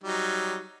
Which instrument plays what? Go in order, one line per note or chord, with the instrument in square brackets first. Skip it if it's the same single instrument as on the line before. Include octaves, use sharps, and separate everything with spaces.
[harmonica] F#3 G3 D#4